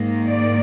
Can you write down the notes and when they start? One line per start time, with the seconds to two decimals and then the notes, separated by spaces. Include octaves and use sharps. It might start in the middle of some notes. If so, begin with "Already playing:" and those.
Already playing: G#2 D#3 A#3
0.27 D5